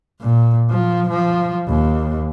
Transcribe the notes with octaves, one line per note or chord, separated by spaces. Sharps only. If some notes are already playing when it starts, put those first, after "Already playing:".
A#2
F3
F3
D#2